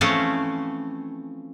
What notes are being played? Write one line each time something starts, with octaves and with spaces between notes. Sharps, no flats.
E3 F3 A3 C4 C#4